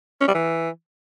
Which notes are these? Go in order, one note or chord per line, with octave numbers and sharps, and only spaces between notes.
C#4
G3
E3